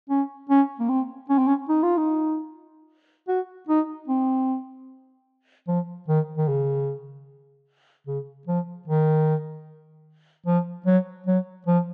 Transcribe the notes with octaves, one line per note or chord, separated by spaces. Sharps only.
C#4
C#4
A#3
C4
C#4
C4
C#4
D#4
F4
D#4
F#4
D#4
C4
F3
D#3
D#3
C#3
C#3
F3
D#3
F3
F#3
F#3
F3